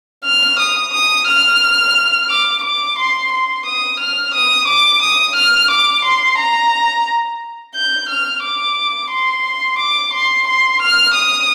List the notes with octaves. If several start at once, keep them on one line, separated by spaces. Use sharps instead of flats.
F6
D#6
D#6
F6
D6
D6
C6
C6
D#6
F6
D#6
D6
D#6
F6
D6
C6
A#5
G6
F6
D6
C6
D6
C6
C6
F6
D#6